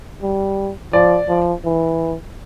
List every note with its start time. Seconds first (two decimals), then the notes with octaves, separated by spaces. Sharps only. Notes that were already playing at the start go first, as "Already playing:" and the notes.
0.22 G3
0.93 F3 D5
1.28 F3
1.65 E3